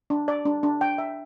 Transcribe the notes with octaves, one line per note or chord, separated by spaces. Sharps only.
D4
D5
D4
D4
G5
E5